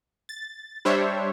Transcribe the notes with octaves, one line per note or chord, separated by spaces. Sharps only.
A6
G3 D4 C5 C#5 E5